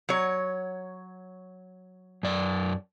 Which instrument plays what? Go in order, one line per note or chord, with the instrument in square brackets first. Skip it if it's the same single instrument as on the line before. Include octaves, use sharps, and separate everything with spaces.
[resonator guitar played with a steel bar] F#3 C#5
[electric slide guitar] F#2 D5